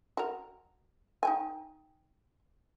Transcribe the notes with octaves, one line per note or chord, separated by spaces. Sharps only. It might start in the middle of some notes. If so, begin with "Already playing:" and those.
F#4 A#4
D#4 G5 G#5